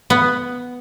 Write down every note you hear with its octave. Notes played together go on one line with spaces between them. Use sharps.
B3